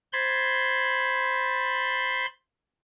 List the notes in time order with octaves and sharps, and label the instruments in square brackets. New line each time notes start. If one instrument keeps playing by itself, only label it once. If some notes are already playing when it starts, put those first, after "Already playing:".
[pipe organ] C5 B5 C6 G#6 A6